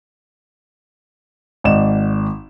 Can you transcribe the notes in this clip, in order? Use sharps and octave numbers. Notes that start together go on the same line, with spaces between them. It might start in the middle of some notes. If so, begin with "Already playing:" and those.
G#1 D5 D#5 E7